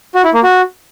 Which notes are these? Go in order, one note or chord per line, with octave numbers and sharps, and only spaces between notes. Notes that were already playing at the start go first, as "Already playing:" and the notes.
F#4
E4
A#3
F#4